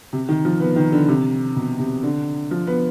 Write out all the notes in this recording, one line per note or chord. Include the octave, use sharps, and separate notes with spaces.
C3
D#3
F3
B3
D#3
D3
C3
B2
C3
D3
F3
B3